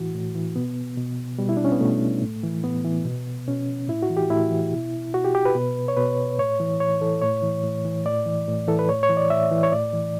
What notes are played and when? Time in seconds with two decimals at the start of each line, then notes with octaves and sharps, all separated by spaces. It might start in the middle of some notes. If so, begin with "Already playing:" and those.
Already playing: A2 E3 F#4
0.15 A2
0.35 E3
0.56 B2 B3
0.97 B2
1.39 B2 G3
1.49 E4
1.57 D4
1.65 C#4
1.72 B3
1.80 B2 A3
2.22 A2
2.44 E3
2.64 A2 B3
2.85 E3
3.05 B2
3.48 B2 C#4
3.89 A2 E4
4.03 F#4
4.10 E3
4.17 G4
4.30 A2 E4
4.51 E3
4.72 B2
5.14 B2 F#4
5.25 G4
5.35 G4
5.45 B4
5.55 B2
5.88 C#5
5.97 B2 B4
6.39 A2 C#5
6.60 E3
6.80 A2 C#5
7.01 E3 A4
7.22 A2 C#5
7.42 E3
7.63 A2
7.85 E3
8.05 A2 D5
8.26 E3
8.48 A2
8.68 E3 A4
8.79 B4
8.89 A2 C#5
9.03 C#5
9.09 E3
9.17 D5
9.30 A2 E5
9.51 E3
9.63 C#5
9.72 A2 D5
9.93 E3